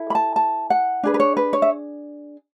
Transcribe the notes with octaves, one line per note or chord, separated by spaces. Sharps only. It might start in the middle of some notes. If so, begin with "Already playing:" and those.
Already playing: E4 A4
B5
A5
A5
F#5
D4 G#4 B4
B4
C#5
B4
C#5
E5